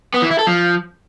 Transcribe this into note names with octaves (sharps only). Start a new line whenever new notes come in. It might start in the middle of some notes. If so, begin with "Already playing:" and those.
B3
E3
E4
A4
F3